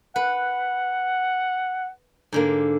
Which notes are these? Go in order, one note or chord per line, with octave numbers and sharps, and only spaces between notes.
B4 F#5
G#2 D3 A#3